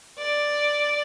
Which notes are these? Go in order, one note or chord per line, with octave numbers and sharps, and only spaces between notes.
D5